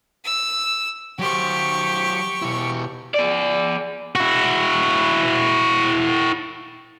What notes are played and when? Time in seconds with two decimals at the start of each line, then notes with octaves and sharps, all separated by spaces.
0.24 E6
1.19 F#3 G4 C5 C#6
2.42 B2 E4
3.14 G#4 D5
4.15 E4 F#4